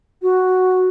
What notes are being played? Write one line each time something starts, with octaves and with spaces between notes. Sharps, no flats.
F#4